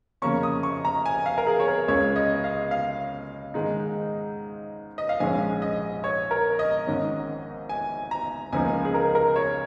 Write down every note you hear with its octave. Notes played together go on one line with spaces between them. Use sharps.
F2 C#3 A#3 C#4 C#6
D#6
C#6
A#5
G#5
F5
A#4
G#4
C#5
A#4
C#2 C#3 G#3 C#4 C#5
D#5
F5
F5
G#2 D#3 G#3 D#4
D#5
F5
A#1 G#2 F3 G#3 C#4 G#5
D#5
C#5
A#4
D#5
G#1 G#2 D#3 C#4
G#5
A#5
C#2 C#3 F3 A#3 D#4 G#5
G#4
A#4
A#4
C#5